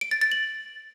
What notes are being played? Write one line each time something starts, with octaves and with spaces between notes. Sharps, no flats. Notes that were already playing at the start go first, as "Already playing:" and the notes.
D7
A6
A6
F#7